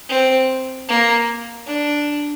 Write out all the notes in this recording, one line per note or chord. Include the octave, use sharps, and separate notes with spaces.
C4
A#3
D4